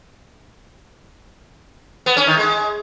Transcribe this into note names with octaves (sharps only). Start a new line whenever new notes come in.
B3
C#4
D#3
G#3